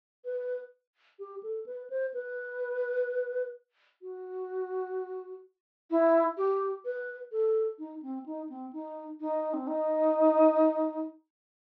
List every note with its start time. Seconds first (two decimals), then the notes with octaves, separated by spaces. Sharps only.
0.25 B4
1.19 G4
1.43 A4
1.66 B4
1.90 C5
2.14 B4
4.02 F#4
5.91 E4
6.37 G4
6.85 B4
7.32 A4
7.79 D#4
8.02 C4
8.26 D#4
8.49 C4
8.73 D#4
9.20 D#4
9.53 C4
9.67 D#4